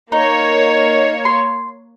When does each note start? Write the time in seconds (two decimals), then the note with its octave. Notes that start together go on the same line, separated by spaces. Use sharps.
0.12 A#3 D#4 C#5
1.25 C6